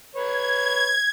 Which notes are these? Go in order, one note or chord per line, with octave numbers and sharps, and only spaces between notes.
B4 C#5 G#6